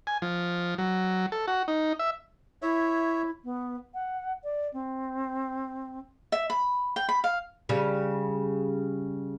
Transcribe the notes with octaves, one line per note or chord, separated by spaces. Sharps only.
G#5
F3
F#3
A4
F#4
D#4
E5
E4 C#5 E5
B3
F#5
D5
C4
E5
B5
G5
B5
F5
C#3 G3